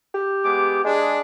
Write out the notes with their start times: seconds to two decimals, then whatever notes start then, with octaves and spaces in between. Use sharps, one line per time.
0.14 G4
0.44 G#3 B3 D6
0.84 G#3 D4 G#4